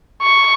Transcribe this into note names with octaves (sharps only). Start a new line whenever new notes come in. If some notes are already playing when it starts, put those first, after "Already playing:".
C#6